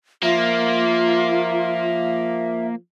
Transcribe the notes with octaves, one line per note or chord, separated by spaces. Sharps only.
F3 A#3 F4 E5